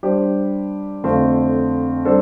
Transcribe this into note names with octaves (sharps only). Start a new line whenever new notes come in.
G3 D4 G4 C5
F2 D3 A3 C4 F4
G3 D4 A4 C5